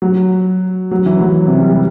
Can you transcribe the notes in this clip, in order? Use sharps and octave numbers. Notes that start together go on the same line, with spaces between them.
F#3
F#3
E3
F#3
C3
G3
G3